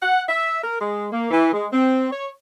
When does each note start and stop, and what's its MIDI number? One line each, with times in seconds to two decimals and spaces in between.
0.01 0.22 78
0.29 0.57 76
0.63 0.77 70
0.80 1.07 56
1.12 1.27 58
1.31 1.52 52
1.53 1.67 56
1.72 2.07 60
2.11 2.29 73